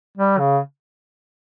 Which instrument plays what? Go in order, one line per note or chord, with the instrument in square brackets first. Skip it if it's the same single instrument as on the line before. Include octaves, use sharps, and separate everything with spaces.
[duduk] G3
C#3